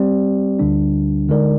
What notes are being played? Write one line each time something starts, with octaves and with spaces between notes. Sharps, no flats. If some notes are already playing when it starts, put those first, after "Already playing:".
Already playing: G3 C4 G4 D5
D2 D3 G3 D4
D3 G#3 D#4 A#4 D5